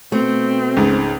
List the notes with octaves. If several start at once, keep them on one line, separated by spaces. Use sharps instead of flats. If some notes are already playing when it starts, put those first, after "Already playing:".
B2 A3 C4
C#2 G#2